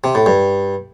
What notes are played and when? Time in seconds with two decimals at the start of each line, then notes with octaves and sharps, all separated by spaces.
0.04 C3
0.15 A2
0.26 G2